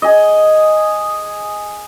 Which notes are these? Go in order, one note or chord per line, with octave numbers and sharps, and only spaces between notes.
G#4 D#5